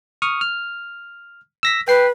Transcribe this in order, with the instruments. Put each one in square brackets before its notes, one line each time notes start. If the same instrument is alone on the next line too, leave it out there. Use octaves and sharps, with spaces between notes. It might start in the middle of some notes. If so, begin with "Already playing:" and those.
[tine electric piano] C#6 D#6 F6
F6
E6 A#6 B6
[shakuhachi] B4 [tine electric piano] G5 C7